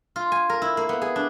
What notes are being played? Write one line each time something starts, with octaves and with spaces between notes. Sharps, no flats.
F4
G#5
A#4
E4
A#3
B3
G#4
D4